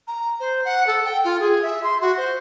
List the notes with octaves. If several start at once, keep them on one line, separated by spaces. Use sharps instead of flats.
A#5
C5
F#5
A4
G5
F4
G#4
E5
C6
F#4
C5